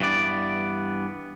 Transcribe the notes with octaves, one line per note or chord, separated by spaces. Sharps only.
G2 E3 B3 D5